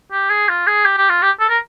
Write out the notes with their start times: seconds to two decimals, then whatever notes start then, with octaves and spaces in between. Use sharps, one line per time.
0.12 G4
0.30 G#4
0.49 F4
0.67 G#4
0.85 G4
0.98 G4
1.09 F4
1.22 G4
1.40 A4
1.50 A#4